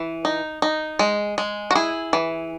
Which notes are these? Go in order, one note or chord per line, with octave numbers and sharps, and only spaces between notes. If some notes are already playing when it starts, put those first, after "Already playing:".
Already playing: E3
D#4
D#4
G#3
G#3
F#4
E4 G#4
E3